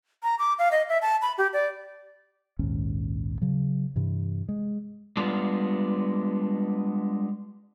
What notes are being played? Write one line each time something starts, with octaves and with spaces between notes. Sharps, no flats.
A#5
D6
F5
D#5
E5
A5
B5
G4
D5
A#1 D#2 G#2 C#4
C#3 F#3
G2 C3 E3
G#3
G3 G#3 B3 D4 F4